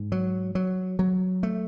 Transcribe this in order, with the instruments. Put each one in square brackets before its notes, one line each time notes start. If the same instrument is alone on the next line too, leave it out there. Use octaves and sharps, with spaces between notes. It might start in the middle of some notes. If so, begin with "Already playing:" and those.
Already playing: [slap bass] G#2
F#3
F#3
F#3
A3